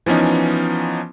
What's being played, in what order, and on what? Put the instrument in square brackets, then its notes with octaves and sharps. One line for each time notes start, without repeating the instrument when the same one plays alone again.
[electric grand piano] E3 F3 B3 C#4 D#4